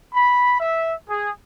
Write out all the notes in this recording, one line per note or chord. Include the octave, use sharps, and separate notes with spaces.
B5
E5
G#4